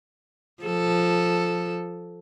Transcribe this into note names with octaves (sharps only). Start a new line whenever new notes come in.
F3 A4